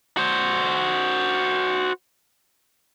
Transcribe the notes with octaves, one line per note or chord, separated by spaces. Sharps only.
F#4 C5